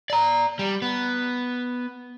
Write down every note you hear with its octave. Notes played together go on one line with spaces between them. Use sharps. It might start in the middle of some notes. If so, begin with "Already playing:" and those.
D5 A#5
G3
B3